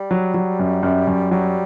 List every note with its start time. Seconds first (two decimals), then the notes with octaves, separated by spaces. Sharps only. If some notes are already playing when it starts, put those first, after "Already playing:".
Already playing: G3
0.11 F#3
0.34 F#3
0.59 F#2
0.83 F#2
1.07 F#2
1.31 F#3 G3